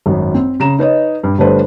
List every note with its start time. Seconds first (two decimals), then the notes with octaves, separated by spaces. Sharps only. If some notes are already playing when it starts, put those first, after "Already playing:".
0.06 G#1 F#2
0.34 C4
0.60 C#3 A#5 E7
0.79 D#4 B4 C#5 D#5
1.24 G2
1.38 G1 G3 A3 D4 B4 C5